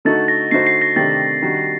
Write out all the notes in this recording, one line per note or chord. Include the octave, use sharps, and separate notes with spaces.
D3 A3 D#4 F#4 A4 A6
A#6
D3 A3 D#4 F#4 C5 C7
C7
A#6
C3 D#3 A3 D4 G4 A6
D#3 G3 D4 F#4